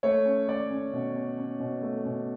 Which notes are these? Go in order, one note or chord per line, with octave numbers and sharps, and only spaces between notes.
A3 C#5
C#4
A3 D5
C#4
B2
C#4
C#4
B2
A3
B2